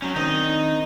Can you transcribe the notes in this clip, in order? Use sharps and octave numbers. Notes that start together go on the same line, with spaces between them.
F#3 C#4
D#3 C4 D4 D#4 D#5